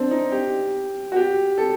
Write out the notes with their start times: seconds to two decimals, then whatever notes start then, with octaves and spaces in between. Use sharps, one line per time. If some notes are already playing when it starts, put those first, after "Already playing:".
Already playing: C4 D4
0.11 D#4
0.32 G4
1.12 F#4
1.16 G4
1.58 A4